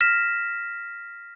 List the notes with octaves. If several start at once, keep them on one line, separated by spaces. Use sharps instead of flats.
F6 A#6 B6 E7